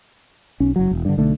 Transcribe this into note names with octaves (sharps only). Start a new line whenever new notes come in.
B1 C#4
F#1 F#3
E1
G2 D3
B1 D3 A3